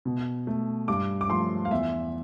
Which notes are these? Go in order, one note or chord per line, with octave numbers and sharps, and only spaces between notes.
B2
A3
G2 D6
D6
F3 A3 C6
F5
E2 E5